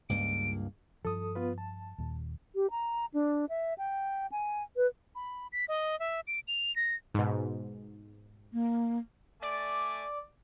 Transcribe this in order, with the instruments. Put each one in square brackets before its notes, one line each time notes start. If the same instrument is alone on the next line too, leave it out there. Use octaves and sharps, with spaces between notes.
[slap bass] C#2 G2 A#3 [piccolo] D7
[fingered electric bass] G2 F3 [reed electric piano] A4 D#6
[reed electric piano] B3 F4 B4
A5
[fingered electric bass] D#2 A#2
[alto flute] G4
A#5
D4
E5
G5
G#5
B4
[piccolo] B5
B6
D#5
E5
D7
F7
A#6
[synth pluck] G#2 B2
[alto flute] A#3
[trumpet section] A3 G#5 D6 [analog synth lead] D5